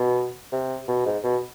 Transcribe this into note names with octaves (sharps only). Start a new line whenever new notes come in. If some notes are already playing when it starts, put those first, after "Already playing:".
Already playing: B2
C3
B2
G#2
B2